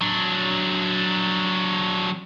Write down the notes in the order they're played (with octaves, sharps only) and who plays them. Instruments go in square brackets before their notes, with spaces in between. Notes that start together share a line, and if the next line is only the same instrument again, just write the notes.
[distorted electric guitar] F#3 D4